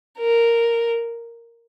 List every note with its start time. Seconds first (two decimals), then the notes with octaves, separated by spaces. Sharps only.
0.19 A#4